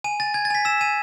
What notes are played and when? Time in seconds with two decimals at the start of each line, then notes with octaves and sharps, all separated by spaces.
0.04 G#5 D#7
0.20 G#5 A6
0.34 G#5 G#6
0.45 A6
0.50 G#5 B6
0.65 E6 E7
0.81 G#5 D#7